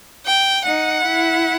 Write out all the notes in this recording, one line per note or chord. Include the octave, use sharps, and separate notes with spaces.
G5
D#4 F#5
E4